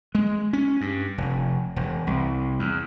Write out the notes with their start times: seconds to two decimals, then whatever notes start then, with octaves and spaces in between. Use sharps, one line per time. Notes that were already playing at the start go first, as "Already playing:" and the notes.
0.15 G#3
0.53 C#4
0.81 G2
1.18 F1
1.76 E1
2.07 C2
2.59 E2